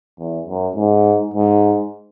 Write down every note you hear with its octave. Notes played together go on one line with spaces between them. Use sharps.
E2
F#2
G#2
G#2